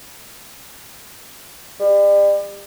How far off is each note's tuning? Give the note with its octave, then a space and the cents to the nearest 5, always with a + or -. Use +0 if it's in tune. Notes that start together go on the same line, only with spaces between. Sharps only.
G3 +35